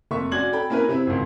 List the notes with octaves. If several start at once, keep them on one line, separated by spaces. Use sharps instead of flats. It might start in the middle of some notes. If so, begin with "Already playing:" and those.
F1 A#3 E5 C#6
C#4 F#4 D5 G#6 F#7
A4 G5 B5
A#3 C#4 E4 A#4 B4
C3 C4 E4
G#1 C#2